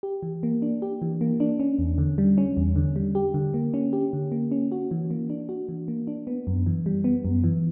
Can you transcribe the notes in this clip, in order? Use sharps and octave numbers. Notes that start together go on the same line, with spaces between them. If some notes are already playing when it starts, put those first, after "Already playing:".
G4
E3
A#3
D4
G4
E3
A#3
D4
C#4
E2
D3
G3
C#4
E2
D3
G3
G4
D3
A#3
C#4
G4
D3
A#3
C#4
F#4
E3
A#3
D4
F#4
E3
A#3
D4
B3
F#2
E3
G3
B3
F#2
E3